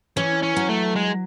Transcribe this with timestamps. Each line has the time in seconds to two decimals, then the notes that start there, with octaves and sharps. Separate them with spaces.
0.17 E3 C#4
0.43 C#4
0.57 F#3
0.69 A3
0.96 G#3